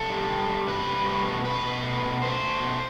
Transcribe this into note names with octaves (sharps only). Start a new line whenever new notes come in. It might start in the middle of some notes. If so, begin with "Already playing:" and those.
Already playing: C3 A4
G3
G3
G3
C3 B4
G3
A3
B2
A3 B4
B2
A3
B2
A3 C5
A3
B2